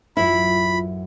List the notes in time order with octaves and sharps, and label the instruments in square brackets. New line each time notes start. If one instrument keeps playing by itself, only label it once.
[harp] A1 F#2 F#3 [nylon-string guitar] E4 [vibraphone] F4 [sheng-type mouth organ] B5